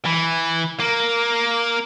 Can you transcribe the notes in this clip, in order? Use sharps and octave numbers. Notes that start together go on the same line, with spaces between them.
E3
A#3